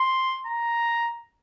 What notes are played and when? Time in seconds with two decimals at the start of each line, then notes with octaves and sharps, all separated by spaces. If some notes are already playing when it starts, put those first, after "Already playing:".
Already playing: C6
0.47 A#5